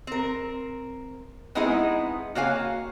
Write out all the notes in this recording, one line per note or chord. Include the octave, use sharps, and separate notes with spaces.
C4 A#4
G#3 B3 C4 D#4 E4 G#4
A#3 F#4 C#5 F5 G#5